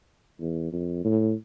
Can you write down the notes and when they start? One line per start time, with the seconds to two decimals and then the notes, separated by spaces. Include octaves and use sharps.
0.41 E2
0.72 F2
1.05 A2